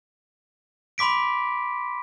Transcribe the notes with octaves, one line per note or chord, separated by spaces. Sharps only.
B5 C6 D6 B6 D7